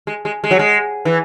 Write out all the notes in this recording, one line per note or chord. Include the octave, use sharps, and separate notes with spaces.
G#3
G#3
G#3
F#3
G#3
E3